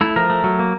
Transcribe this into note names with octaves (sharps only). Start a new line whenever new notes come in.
A3 E4
F3 A#4
A3
F#3
A#3